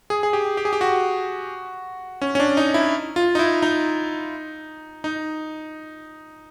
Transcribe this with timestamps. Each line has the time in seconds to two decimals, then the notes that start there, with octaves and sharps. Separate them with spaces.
0.10 G#4
0.23 G#4
0.33 G4
0.57 G4
0.65 G#4
0.73 G4
0.81 F#4
2.22 C#4
2.35 C#4
2.40 D4
2.57 D#4
2.74 E4
3.16 F4
3.35 D#4
3.39 E4
3.62 D#4
5.04 D#4